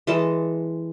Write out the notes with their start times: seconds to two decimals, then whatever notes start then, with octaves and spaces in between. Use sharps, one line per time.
0.07 E3 G#3 A4 A5